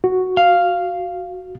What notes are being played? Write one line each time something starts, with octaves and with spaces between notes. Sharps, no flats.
F#4
F5